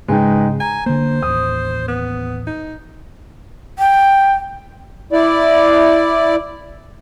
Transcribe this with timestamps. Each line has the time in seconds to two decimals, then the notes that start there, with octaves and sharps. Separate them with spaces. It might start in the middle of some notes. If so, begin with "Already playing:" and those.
0.08 G#2 C#3 G#3 D#4 B4 G5
0.60 G#5 A#5
0.86 D3 A#3 C5
1.22 A1 D#2 D#6
1.88 B3
2.47 D#4
3.79 G5
5.12 E4 D5